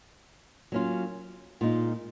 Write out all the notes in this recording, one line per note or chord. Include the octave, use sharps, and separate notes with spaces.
F#3 A#3 C#4 F4
A#2 G#3 D#4 F4